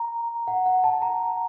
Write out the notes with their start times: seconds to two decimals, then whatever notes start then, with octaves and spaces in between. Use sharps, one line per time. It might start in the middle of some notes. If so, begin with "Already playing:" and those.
Already playing: A#5
0.47 F#5
0.66 F#5
0.84 A5
1.02 A#5